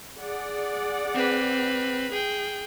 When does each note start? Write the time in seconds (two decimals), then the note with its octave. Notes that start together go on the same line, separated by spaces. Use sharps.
0.21 G#4 D5 F#5
1.14 C4 B4
2.11 G#4 G5